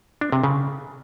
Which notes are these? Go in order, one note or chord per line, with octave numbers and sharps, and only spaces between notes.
D4
C3
C#3